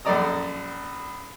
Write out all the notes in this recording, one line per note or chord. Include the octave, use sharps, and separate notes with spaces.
A#1 F#2 A4 D5 A#5 D#6